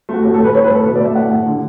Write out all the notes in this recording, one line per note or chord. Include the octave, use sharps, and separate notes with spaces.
A3 F#4
A2 G4
A4
A2
B4
A2 C#5
B4
A2
A4
B2 B4
D5
A3 E5
A2 F#5
A2
D3